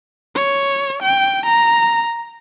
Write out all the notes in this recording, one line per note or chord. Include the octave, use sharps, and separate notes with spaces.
C#5
G5
A#5